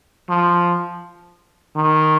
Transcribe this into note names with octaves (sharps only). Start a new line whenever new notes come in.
F3
D#3